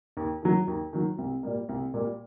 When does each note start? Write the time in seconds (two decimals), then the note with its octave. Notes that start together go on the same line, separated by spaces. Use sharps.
0.17 D#2
0.43 D#3 F#3
0.67 D#2
0.93 D#3 F#3
1.18 C2
1.43 A#2 G3 A#3
1.69 C2
1.94 A#2 G3 A#3